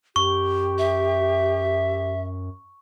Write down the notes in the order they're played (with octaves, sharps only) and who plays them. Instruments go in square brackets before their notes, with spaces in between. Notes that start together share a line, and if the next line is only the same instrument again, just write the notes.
[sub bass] F#2 [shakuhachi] G4 [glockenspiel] C#6
[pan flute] E5